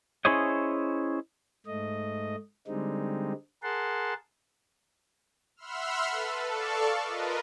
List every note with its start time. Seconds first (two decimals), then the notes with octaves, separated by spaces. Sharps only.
0.25 C#4 E4 G#4 C5 C#5 D#5
1.66 G#2 A3 D#5
2.67 D3 G3 G#3 C4 D#4
3.63 G#4 A#4 F#5 A5 C6
5.56 E5 F#5 B5 C6 E6 F6
6.04 A4 B4
6.48 A4 D5 F5 A5 C#6
7.02 F4 A#4 B4 D#5